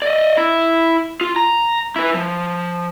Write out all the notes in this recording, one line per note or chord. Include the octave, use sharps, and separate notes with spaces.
D5 D#5
E4
F4
A#5
E4 B4
F3